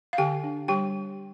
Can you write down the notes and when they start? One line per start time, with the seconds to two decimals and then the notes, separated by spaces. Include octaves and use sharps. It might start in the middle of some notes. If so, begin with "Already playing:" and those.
0.13 F5
0.18 D3 G4 G5
0.44 D4
0.68 G3 G4 G5